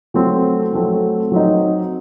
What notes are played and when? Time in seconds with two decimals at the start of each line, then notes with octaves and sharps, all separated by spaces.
0.14 F#3 A3 C4
0.73 F#3 A3 C4
1.32 F#3 C4 D#4